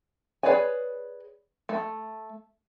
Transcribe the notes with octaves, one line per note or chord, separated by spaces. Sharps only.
G#4 B4 C#5 D5 G#5
A3